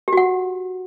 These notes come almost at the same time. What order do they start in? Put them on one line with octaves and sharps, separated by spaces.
G4 F#4 F#5